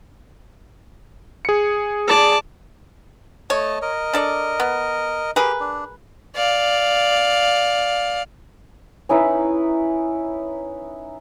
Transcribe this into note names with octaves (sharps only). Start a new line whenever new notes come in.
G#4 C#7
D5 A5
A3 C#5 D#5 A5
A#4 D#5
D4 A4 D5
B3
G4 G#4 A#4 B4
D4
D5 F5
C#4 D#4 E4 B4